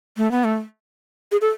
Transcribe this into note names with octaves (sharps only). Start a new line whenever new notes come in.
A3
B3
A3
G#4
A4